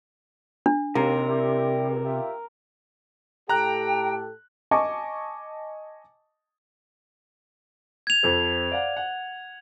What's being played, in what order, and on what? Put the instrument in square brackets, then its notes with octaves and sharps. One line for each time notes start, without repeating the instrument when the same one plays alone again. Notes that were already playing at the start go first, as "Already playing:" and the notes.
[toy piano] D4
[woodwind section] D#2 [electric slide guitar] C3 [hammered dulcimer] A#4
[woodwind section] G3 E4 G4
C#2
F4 G4 E5
[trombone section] A2 G4 A4 [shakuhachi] G5 [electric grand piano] A#5 F#6
[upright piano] D#5 G#5 A5 C#6 D6
[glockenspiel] G#6 F7
[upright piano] F2 A4 C5
D5 F5 F#5
F#5